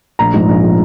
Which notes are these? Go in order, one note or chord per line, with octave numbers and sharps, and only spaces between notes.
A#1 A#5
G#2 F3
A#1
F3